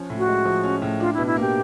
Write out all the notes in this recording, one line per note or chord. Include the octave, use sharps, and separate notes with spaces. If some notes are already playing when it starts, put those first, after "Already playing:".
Already playing: F3 C#4
A2
F#4
G#3
F3
C#4
A2
D4 F4
E4
B2
E4
A#3 G4